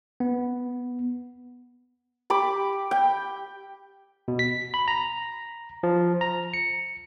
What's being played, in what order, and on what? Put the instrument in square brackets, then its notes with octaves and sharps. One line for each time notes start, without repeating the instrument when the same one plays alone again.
[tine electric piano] B3
[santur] G4 B5 D6
G5
[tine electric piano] B2
B6
B5
A#5
F3
A#5
C#7